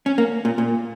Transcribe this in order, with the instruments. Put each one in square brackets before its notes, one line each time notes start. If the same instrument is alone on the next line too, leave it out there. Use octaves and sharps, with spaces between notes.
[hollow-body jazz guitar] C#4
A#3
A#2
A#2